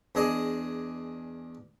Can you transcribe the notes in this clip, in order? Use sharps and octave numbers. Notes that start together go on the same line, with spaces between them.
E2 D4 G#4 D#5 D#6